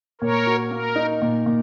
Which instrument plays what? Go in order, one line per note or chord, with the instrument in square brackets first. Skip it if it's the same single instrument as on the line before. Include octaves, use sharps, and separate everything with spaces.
[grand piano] A#2 [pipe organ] A#4 C#5
[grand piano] F#4
[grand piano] A#3 [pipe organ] A#4
[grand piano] D#4
A#2
A#2